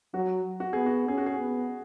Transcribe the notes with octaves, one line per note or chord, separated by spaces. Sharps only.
F#3 F#4
F#4
B3 G#4
F#4
C#4 G#4
F#4
G#4
B3